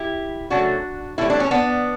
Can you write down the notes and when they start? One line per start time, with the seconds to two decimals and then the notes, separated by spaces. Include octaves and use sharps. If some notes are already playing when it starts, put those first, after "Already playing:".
Already playing: E4 G4
0.50 C#3 F#3 A3 D4 F#4
1.18 A2 E3 G3 E4
1.30 D4
1.40 C#4
1.51 B3 D4